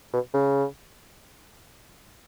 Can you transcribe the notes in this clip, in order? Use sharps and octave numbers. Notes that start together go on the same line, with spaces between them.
B2
C#3